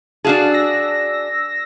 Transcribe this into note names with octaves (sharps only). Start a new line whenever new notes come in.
D4 F#4 G#4 F5 A5
E6 A#6